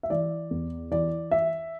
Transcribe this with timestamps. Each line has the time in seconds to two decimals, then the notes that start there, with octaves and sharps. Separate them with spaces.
0.03 E5
0.10 E3 D5
0.51 E2
0.91 E3 D5
1.31 E5